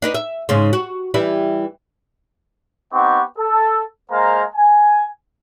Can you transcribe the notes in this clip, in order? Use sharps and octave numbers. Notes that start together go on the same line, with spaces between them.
D4 D#4 B4
E5
G#2 C#3
F#4
E3 G3 E4
B3 C4 D#4 G4 F#5 C#6
A4
G#3 A#3 C5 F5 A#5
G#5